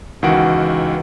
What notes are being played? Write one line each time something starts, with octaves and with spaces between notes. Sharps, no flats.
C#2 D#3 E3 F#4 F#5 D7